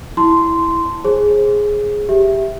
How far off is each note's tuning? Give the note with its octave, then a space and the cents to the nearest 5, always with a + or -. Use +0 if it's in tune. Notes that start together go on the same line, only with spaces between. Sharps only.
E4 +0 A5 +0 C6 -10
G#4 +0 C5 +35
G4 +0 E5 +0